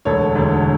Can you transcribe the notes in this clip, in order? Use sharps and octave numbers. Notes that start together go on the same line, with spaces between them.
E1 D2 D3 A4 C#5
E1 D2 D3